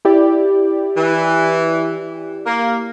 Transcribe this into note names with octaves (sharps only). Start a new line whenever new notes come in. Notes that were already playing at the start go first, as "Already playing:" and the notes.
E4 G4 D5
E3
A#3